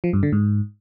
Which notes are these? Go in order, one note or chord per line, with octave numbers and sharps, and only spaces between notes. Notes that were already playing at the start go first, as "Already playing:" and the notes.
F3
G2
D3
G#2